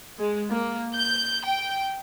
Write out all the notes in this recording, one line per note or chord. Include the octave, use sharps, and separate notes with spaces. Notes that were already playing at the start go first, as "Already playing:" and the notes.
G#3
A#3
G6
G5